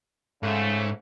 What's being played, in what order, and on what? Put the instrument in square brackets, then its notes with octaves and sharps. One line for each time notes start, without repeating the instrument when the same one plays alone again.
[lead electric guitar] G#2 [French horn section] C#3 A3